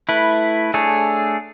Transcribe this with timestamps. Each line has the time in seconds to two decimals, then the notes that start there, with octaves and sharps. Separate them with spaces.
0.09 A3 E4 B4
0.74 A3 D4 G#4 C#5